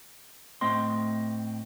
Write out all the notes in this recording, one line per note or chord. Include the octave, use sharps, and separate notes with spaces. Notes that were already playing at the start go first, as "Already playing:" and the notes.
A2 A3 C4 D#5 C6